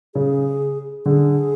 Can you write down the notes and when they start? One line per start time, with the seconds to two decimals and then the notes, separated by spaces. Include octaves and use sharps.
0.15 C#3 G#4
1.06 D3 G#4